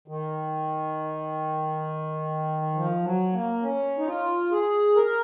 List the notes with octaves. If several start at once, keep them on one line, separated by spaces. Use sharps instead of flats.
D#3
F3
F#3
A#3
C#4
D#4
F4
G#4
A#4